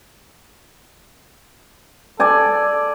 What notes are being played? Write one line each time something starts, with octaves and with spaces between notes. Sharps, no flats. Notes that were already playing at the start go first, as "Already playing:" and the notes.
A4 D5 G#5